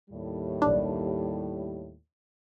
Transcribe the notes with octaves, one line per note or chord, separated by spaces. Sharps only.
D#2 A2 G3
B1 D4